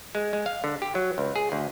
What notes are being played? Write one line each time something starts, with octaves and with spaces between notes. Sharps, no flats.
G#3
G#3
F5
D3
G4
F#3
C#2
G#4
D2